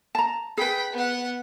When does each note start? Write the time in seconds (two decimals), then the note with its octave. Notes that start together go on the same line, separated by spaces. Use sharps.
0.15 A5 A#5
0.57 G#4 B4 G5 B5
0.93 B3 F#5